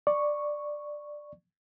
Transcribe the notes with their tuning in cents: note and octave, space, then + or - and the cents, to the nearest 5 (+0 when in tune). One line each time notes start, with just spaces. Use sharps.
D5 +10 C#6 -5